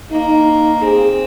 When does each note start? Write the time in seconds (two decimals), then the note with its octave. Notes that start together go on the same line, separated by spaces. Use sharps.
0.11 A#3 D#4
0.82 C4 G#4